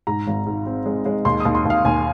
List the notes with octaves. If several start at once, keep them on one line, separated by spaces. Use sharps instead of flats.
G#2 A#5
G#1
G#2
C4
G#3
G#3
D#2 C6
D#2 D#6
C6
D#2
F5
D#2 G#5